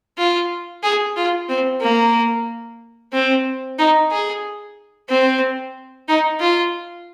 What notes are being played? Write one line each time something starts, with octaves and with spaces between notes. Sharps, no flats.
F4
G#4
F4
C4
A#3
C4
D#4
G#4
C4
D#4
F4